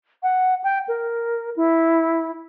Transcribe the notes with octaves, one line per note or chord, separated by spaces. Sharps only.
F#5
G5
A#4
E4